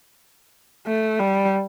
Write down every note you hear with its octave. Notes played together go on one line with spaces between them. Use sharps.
A3
G3